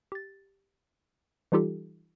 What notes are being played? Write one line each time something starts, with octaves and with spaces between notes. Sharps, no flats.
G4 A6
E3 G3 D#4 F4 G4 A4